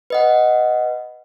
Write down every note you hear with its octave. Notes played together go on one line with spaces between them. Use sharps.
B4 D#5 F#5